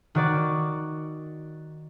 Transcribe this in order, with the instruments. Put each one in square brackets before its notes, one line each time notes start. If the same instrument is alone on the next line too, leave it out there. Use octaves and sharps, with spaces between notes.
[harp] D#3 F#4 D5